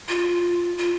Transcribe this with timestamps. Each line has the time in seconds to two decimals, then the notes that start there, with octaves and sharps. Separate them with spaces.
0.08 F4
0.78 F4